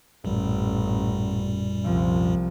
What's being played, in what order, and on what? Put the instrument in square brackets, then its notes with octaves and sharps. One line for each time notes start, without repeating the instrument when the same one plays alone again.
[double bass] A1 [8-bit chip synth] F#2 A#2 G3
[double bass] C2 F3